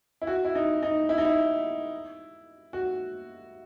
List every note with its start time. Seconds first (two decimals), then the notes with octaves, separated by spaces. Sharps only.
0.21 E4
0.27 F#4
0.44 E4
0.55 D#4
0.83 D#4
1.09 E4
1.18 D#4
1.25 E4
2.73 F#4